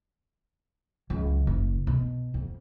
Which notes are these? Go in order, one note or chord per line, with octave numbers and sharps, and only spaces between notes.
C#2 F#3
F#1
B2
F2